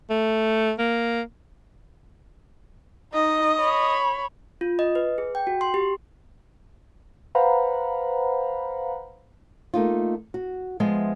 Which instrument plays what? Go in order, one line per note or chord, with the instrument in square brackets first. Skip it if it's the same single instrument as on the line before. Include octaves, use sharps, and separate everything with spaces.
[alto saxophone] A3
A#3
[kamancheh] D#4 [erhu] D#5
[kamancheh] C#5 B5
[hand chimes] F4
D#5
B4
G#4
G5
F#4
C6
G4
[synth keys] B4 C5 F5 F#5 A#5 B5
[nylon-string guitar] A3 A#3 D#4 F4
F#4
F3 G#3 B3 E5